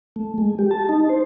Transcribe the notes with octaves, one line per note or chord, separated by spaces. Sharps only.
A3
G#3
G4
A5
D#4
C5